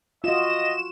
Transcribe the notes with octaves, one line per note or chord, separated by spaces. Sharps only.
F4 F#4 D#5 E7